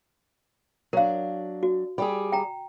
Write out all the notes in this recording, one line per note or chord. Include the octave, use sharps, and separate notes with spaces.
F#3 D4 A#4 F5
F#4
G3 G4 G#4
G5 A#5